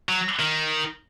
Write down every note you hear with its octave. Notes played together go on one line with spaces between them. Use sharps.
F#3
D#3